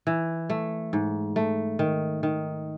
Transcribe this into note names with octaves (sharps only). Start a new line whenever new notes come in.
E3
A3
G#2
A3
D#3
D#3